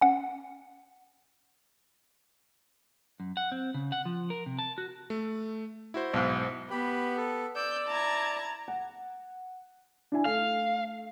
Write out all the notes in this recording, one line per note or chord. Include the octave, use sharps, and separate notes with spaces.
C#4 F#5
F#2
F#5
C4
C#3
F#5
F3
A#4
C3
A5
F#4
A3
E4 F#4 C5
B1 G#2
B3 G4 B5
A4
D5 E6 G6
E4 A5 A#5 G#6
F#5
D4 E4 G#5
A3 F5